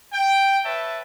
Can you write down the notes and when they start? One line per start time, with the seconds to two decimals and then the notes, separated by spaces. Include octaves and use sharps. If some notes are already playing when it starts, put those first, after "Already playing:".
0.13 G5
0.66 B4 C#5 E5 A5